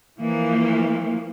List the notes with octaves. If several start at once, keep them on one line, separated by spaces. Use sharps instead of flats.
E3 F3 A#3